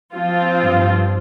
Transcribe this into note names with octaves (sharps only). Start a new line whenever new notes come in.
F3 C4 F4
G2